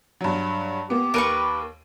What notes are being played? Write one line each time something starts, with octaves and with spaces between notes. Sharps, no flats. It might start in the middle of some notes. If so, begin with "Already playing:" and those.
G2 F#3
A#3 B3 G4
D#2 A#4 B4 C#6 D7 D#7